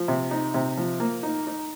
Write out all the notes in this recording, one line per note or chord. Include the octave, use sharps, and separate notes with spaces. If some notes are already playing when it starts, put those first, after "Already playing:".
Already playing: F3
C3
D#4
C3
F3
A#3
D#4
D#4